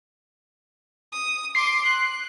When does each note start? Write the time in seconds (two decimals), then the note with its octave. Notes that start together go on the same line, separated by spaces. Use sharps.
1.12 D#6
1.55 C6 D6 C7
1.86 F#6